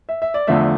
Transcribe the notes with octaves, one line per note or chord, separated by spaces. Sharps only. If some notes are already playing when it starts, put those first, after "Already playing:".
E5
E5
D5
E2 D3 F3 A3 E5